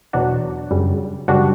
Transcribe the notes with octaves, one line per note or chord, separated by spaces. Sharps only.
E2 B2 F#3 D4 F#4
F#2 C#3 G3
F#2 C#3 G3 D4 F#4